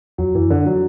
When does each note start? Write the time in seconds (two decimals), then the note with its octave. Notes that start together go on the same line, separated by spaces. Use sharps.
0.18 E2 F#3
0.35 F#2 E3
0.50 D3
0.66 F#3